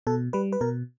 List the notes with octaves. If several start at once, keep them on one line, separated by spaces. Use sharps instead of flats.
B2 A4
G3 B4
B4
B2 A#4